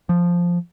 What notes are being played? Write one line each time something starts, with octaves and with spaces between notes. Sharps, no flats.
F3